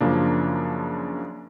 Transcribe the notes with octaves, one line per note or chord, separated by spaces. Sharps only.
F#2 C#3 F3 A#3 D4